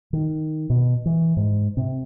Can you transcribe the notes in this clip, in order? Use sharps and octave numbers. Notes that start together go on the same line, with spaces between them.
D#3
B2
E3
G#2
C3